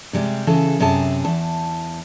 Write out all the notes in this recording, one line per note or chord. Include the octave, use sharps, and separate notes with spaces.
C3 G3 G#3
C#3 E3 G#4 A4
F#2 C3 G#4 A5
E2 A5